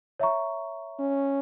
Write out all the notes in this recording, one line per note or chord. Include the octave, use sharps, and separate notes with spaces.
C#5 E5 A#5 C#6
C#4